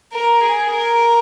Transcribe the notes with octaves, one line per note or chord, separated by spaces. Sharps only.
A#4
G#4
A#4